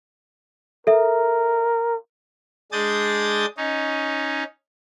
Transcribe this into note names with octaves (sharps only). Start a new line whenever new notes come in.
A4 A#4 E5
G#3 D4 G#4 D#6 G6 A6
C#4 D#4